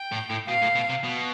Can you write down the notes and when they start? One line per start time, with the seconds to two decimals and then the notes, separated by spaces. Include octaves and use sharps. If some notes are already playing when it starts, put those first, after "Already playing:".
Already playing: G5
0.12 A2
0.30 A2
0.48 B2 F5
0.62 A2
0.76 B2
0.90 C3
1.04 B2